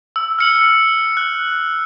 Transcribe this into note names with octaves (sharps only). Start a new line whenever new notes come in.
E6
F6 C#7 F#7
F#6